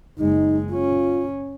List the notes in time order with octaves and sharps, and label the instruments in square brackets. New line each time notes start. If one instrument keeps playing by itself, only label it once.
[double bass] F#1 G#3 [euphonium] D#4
[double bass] C#4 [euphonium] F4